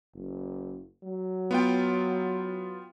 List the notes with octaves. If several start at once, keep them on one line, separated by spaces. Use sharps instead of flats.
F#1
F#3
B3 F4 G5